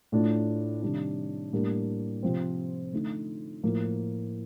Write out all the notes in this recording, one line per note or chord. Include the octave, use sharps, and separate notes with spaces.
A2 A3 D4 F4
C3 D#3 G3 D4
A2 G3 A#3 D4
C3 F3 C4
D3 A3 D#4
A2 F3 A#3